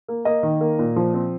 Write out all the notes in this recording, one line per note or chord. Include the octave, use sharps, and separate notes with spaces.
A#3
A#3 D#5
D#3
A#3
A#2
F3
C4